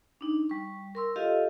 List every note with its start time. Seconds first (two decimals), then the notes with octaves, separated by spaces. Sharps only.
0.21 D4 D#4
0.49 G3 C#6
0.95 A#4 C6 E6
1.16 F4 G4 A4 D#5 F5